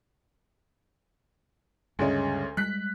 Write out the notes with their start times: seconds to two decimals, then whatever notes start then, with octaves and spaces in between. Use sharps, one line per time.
1.99 D2 G2 C#3 G#3 C#4
2.57 G3 G#3 F#6 B6